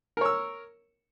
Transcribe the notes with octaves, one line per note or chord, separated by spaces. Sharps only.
A#4 C#5 E6